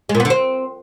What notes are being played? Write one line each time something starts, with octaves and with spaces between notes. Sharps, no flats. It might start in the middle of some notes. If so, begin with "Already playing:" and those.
G#3
A#2
B3
D3
C4